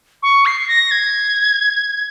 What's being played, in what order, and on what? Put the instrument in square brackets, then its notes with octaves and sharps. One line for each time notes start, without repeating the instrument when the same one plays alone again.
[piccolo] C#6
C7
A#6
G#6